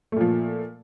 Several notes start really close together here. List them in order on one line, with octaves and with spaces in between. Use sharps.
A3 A#2 F3